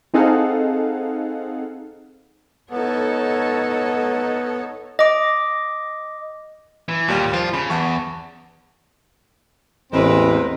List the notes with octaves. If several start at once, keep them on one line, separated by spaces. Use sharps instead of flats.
C4 D#4 G#4 A4 F5 F#5
B3 D#4 A4 C#5
D#5 D6
E3
D#2 A#2 G3
F3 F4
C#3 B5
E2 F#5 A5 C#6
A1 E2 G#3 C4 A#4 B4